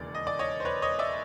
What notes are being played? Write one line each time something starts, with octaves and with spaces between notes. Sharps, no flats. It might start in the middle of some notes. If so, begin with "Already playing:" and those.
Already playing: E1 D#2 C#3 E3 D5
D#5
D5
C#5 D#5
C5
B4 C#5
C#5 D#5
D5 E5